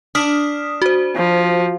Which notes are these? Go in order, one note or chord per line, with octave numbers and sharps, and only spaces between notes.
D4 D#6 F6 B6
F#4 C5
F3